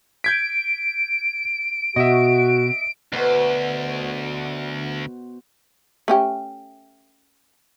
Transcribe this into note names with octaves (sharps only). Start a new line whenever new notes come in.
G6 G#6 B6 D7
B2 F#4 D#5 E5
D2 B2 F#4 C5
A3 C#4 G4